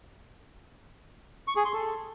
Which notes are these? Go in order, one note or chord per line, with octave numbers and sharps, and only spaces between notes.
C#6
G#4
C6
A4